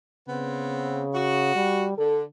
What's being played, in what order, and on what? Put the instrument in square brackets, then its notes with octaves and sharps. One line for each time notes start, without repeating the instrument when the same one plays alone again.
[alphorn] C#3 [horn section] B3 C4
[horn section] F#4
[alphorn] G3
[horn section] D3 [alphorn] A4